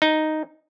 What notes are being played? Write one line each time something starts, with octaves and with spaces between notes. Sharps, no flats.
D#4